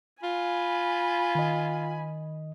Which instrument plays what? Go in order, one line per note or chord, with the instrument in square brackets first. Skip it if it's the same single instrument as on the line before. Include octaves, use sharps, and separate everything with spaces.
[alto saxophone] F4 [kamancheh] G#5 B5
[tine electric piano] D#3 D#5